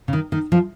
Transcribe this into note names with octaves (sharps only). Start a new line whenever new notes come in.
C#3
D#3
D#3
F3